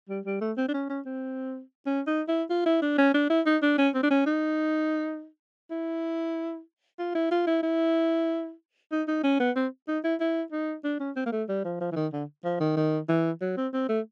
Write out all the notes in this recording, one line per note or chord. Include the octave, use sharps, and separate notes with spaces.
G3
G3
A3
C4
D4
C#4
C#4
C4
C#4
D#4
E4
F4
E4
D4
C#4
D4
E4
D#4
D4
C#4
C4
D4
C#4
D#4
E4
F4
E4
F4
E4
E4
D#4
D#4
C#4
B3
C4
D#4
E4
E4
D#4
D4
C#4
C4
A#3
A3
G3
F3
F3
E3
D#3
D3
F3
D#3
D#3
E3
F#3
C4
C4
A3